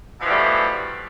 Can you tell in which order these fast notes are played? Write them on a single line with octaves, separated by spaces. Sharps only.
B2 F3 E3 G3 A3